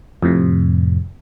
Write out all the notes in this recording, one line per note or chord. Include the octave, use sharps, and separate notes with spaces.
F2 A2 C3